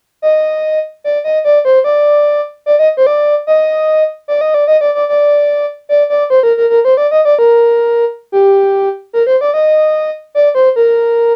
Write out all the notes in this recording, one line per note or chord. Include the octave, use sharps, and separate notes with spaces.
D#5
D5
D#5
D5
C5
D5
D5
D#5
C5
D5
D#5
D5
D#5
D5
D#5
D5
D5
D5
D5
D5
C5
A#4
A#4
A#4
C5
D5
D#5
D5
A#4
G4
A#4
C5
D5
D#5
D5
C5
A#4